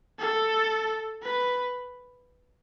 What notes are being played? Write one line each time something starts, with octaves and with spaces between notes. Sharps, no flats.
A4
B4